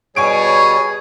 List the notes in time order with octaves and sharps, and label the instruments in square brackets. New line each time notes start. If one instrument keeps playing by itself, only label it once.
[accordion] B2 G3 C#5 [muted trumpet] G#4 [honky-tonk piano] G#5 C#6 D7